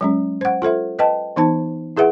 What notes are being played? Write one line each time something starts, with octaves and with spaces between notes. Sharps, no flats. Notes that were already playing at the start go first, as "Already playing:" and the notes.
F#3 G#3 C#4
C5 F#5
F4 A4 C5 E5
B4 D#5 G5 A5
E3 B3 D#4 C5 A5
E4 G#4 B4 E5 F#5